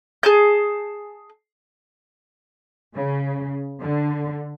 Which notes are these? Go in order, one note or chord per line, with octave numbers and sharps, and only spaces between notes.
G#4 A5 G6
C#3
D3